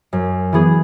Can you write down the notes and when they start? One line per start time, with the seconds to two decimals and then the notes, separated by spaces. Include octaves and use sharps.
0.13 F#2
0.53 E3 B3 G#4